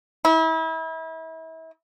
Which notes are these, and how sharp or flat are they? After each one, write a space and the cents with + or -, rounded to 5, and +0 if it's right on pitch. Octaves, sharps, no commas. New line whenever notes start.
E4 -35